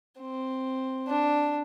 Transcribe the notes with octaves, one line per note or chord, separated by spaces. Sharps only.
C4
D4